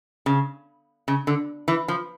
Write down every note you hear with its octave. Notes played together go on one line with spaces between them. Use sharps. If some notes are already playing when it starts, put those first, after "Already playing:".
C#3
C#3
D3
E3
F3